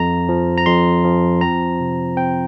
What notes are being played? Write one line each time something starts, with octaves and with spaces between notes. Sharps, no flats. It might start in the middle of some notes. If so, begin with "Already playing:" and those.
Already playing: F2 A#5
F3
A#5
F2 C6
F3
C4 A#5
C3
C4 G5